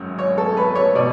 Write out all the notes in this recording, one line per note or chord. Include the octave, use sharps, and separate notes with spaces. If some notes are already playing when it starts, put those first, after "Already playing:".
Already playing: G#1 F#2
C#5
A4
B4
C#5
B2 D5